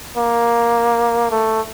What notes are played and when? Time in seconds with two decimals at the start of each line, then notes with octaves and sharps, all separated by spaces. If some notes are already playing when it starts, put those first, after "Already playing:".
0.17 A#3
1.31 A3